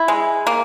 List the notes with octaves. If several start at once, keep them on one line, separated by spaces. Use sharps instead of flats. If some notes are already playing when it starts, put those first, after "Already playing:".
Already playing: E4
G#3
A#3